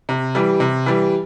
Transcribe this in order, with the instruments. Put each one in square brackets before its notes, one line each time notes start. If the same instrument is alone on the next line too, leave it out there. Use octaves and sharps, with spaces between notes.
[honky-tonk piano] C3
E3 G3
C3
E3 G3